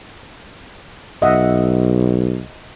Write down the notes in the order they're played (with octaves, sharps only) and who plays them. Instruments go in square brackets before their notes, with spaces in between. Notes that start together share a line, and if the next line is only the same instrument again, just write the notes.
[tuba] B1 [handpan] D#5 E5 F#5